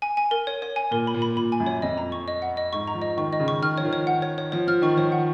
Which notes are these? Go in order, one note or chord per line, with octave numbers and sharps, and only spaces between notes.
G#5
G#5
A#4
C#5
C#5
G#5
A#2 A#4
B5
A#2
B5
A#2 B5
G#5
F#2
C#5
F2 D#5
A#5
C#6
D#5
F#5
D#5
G#2 C#6
A#5
F3
D#5
D#3 C#6
D#5
C#3
C#6
D#3 F6
F3 C#5
D#3
C#5
F#5
C#5
C#5
F3 C#5
F3 F6
D#3 C#6
F3 C#5
F#5